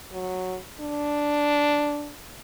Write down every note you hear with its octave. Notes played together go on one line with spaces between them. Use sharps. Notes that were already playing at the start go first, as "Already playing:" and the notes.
F#3
D4